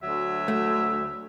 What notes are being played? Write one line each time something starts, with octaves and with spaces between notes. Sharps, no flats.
D2 F#3 E5
A3